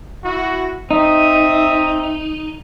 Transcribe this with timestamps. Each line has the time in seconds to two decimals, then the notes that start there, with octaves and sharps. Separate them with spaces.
0.24 E4 F#4
0.91 C4 D#4 E5 D#6